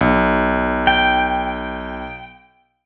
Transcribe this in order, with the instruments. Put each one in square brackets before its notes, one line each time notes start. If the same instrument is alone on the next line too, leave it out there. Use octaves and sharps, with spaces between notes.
[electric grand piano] B1
[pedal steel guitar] G5